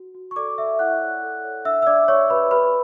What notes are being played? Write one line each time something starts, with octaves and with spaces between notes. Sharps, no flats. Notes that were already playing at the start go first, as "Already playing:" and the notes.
Already playing: F#4
F#4
C#6
A4 D5 D6
D5 E5 E6
E4 F#5 F#6
C#5
A4
C#5
D4 E5 E6
E6
D4 D5 D6
G4 C#5 C#6
G4 B4 B5
G4 B4 B5